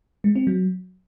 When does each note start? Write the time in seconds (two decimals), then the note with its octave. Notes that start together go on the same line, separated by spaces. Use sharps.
0.24 G#3
0.36 C4
0.47 F#3